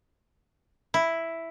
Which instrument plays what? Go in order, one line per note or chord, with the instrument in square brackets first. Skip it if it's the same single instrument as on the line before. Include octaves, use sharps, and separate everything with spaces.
[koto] E4